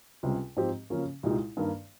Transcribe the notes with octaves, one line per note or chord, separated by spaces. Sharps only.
C#2 C3 G3
G#2 F3 C4 G4
C#3 F3 A#3 C#4
C2 A#2 G#3 D#4 G4
G2 D#3 A#3